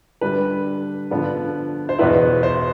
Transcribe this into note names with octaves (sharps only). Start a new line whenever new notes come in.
D3 G3 D4 B4
D3 F3 B3 D4
C5
E2 B2 B3 E4 B4
C5